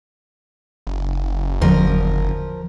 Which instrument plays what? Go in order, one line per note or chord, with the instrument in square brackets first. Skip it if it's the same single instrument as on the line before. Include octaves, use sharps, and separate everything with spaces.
[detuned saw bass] F#1
[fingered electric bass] E2 D3 F#3 [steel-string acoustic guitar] F3 A#4